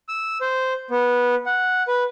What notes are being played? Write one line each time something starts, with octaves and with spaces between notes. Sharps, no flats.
E6
C5
B3
F#5
B4